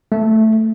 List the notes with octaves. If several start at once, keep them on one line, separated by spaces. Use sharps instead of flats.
A3